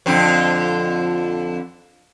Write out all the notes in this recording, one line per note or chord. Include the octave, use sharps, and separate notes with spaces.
F2 D3 C4